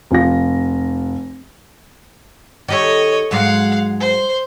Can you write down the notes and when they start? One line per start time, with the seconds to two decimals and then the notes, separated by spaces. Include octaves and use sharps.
0.11 F1 F4 A#6
2.68 D#3 G4 A4 C#5 D#5
3.31 G#2 F#3 G#3 F5 F#5
4.00 C5